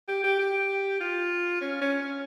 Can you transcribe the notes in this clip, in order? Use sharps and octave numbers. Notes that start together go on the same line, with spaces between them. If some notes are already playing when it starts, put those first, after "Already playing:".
G4
G4
G4
F4
C#4
C#4
C#4